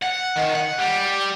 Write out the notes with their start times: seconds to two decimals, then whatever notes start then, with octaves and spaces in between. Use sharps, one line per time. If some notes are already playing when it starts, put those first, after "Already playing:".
0.02 F#5
0.36 D#3
0.55 F#5
0.78 G3